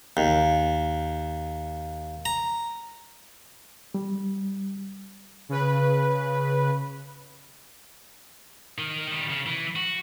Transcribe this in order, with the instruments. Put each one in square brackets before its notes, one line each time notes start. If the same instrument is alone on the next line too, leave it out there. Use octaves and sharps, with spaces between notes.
[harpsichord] D#2
A#5
[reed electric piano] G3
[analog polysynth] C#3 B4
[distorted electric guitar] D#3
D#3 G3
C#3
E3
F#4